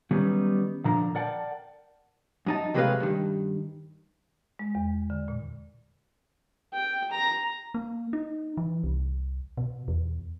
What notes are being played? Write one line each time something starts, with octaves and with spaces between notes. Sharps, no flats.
D#3 F#3 G3 B3 C#4 D#4
A#2 D3 F3 D4 A#5
A#4 D5 F#5 G5 A5
F#2 D#4 A5
C3 F#3 G#3 A3 B4 F5
G2 D#3
G#3
E2
D3
A#2
G5
A#5
A#3
D#4
E3
C2
B2
E2